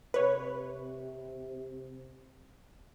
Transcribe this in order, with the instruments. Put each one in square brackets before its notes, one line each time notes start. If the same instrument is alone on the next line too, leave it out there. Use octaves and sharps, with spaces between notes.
[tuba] C3 [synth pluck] B4 C#5